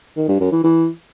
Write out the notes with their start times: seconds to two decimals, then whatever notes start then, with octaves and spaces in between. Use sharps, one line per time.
0.17 D#3
0.28 G2
0.40 F#2
0.52 E3
0.64 E3